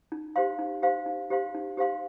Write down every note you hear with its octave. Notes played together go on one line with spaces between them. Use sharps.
D#4
G4 C5 F5 C6
D#4
G4 C5 F5 C6
D#4
G4 C5 F5 C6
D#4
G4 C5 F5 C6